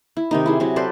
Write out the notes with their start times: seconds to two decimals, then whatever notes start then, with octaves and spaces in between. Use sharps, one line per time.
0.17 E4
0.31 C3 D#3 D#4
0.46 E4 G#4
0.60 C3 F#3 E4
0.76 A4 B4 C5 D5